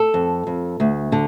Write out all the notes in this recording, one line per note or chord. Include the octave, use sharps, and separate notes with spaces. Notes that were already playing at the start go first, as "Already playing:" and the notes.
Already playing: A4
F2
F2
D2
D3